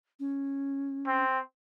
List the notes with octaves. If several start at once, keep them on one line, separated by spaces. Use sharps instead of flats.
C#4
C4